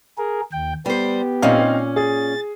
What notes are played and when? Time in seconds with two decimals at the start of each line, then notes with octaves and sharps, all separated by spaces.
0.18 G#4 A#4
0.53 D#2 G5
0.86 G3 B3 G4 C5
1.42 A#2 C4 C#4 D#4 F5
1.96 G#4 A6